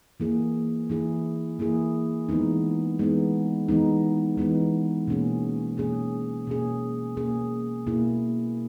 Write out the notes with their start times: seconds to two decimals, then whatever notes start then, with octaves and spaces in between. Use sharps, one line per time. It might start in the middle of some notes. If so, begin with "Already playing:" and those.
0.20 E3 A#3 E4 G#4
0.90 E3 A#3 E4 G#4
1.59 E3 A#3 E4 G#4
2.29 E3 G#3 B3 D#4
2.99 E3 G#3 B3 D#4
3.68 E3 G#3 B3 D#4
4.38 E3 G#3 B3 D#4
5.08 B2 A#3 C#4 G#4
5.77 B2 A#3 C#4 G#4
6.47 B2 A#3 C#4 G#4
7.17 B2 A#3 C#4 G#4
7.87 B2 A#3 E4 G#4